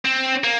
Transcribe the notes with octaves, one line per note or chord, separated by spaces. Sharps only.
C4
A#3